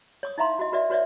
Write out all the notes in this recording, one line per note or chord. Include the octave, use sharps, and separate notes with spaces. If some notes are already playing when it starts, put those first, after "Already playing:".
C#5 D6 D#6
D#4 E4 E5 F5 A#5 C6
F#4 D#5
F#4 B4 D5 E5
F#4 B4 C#5 D5 E5